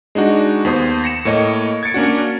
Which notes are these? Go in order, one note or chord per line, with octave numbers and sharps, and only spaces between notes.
G#3 D4 D#4 F#4
D#2 B3 C5 D#6
A#6 C#7 E7
A2 A#3 C#5 D#5
G#6 A6 C#7 D7
A#3 C#4 D4 F#4